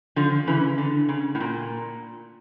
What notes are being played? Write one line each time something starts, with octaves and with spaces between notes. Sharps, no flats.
D3 F3
C#3 E3
D3
C#3
A2
A#2